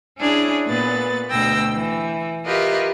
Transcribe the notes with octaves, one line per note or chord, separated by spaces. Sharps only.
C#4 D4 E4 G#4 C#5
A#2 B3 B4 A6
D2 B2 G5 E6 A#6
E3
F4 G4 A#4 B4 D#5 E5